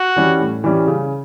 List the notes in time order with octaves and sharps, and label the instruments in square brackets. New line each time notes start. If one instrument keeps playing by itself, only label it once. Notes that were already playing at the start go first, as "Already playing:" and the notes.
Already playing: [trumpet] F#4
[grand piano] E3 G3 C#4
A2
E3 G3 C#4
C#3